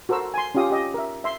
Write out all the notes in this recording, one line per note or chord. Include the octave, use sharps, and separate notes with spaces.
F#4 A4 A#4 C5 E6
G#5 C6
C#4 F4 G4 F5 D#6
G4 D#5
A#4 E5
E5 C6